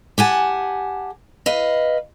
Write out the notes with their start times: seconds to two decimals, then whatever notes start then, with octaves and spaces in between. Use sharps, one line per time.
0.18 G4 F#5 G#5 A5
1.46 B4 D#5 F5